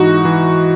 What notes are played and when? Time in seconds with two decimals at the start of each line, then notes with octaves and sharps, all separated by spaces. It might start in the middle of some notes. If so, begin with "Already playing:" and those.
Already playing: G#2 E3 D#4 F#4
0.25 E3